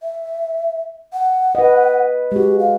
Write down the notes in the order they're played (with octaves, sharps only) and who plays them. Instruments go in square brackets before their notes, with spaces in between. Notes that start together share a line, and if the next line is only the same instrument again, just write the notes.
[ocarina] E5
F#5
[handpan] B4 D#5
[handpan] G#3 F#4 [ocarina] G4
[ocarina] F5